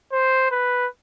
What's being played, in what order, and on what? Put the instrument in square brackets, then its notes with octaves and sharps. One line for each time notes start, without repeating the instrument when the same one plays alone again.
[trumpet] C5
B4